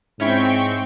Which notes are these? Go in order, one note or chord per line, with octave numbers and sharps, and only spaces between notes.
G#2 C4 C#4 E4 G5 C#6